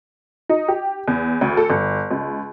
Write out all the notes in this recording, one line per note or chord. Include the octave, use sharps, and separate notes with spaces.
D#4
G4
E2
D2
A4
G1
C#2